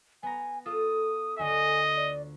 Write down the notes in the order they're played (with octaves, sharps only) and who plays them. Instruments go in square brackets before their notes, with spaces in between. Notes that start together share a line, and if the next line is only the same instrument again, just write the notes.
[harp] B3 A#5 [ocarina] G#5
[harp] F4 A4 [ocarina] D#6
[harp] D2 D3 [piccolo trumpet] D#5 [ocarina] G#5
[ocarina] D5